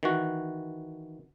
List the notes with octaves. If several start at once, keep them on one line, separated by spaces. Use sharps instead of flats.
D#3 E3 F#4